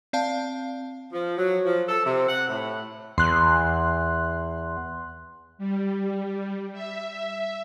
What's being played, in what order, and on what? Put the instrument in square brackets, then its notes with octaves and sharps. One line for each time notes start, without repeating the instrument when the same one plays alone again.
[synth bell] C4 D5 F5 A5
[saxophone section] F3
F#3
F3
A4
C3
F#5
A2
[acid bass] E2 [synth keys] C6 F#6
[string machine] G3
E5